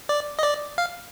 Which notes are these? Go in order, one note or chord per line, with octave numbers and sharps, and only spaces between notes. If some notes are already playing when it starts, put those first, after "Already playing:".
D5
D#5
D5
F5